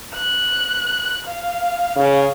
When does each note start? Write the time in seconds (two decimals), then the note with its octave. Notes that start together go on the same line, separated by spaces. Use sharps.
0.16 F#6
1.27 F5
1.96 C#3